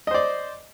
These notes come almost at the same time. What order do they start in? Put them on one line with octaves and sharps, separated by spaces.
D#5 C5 D5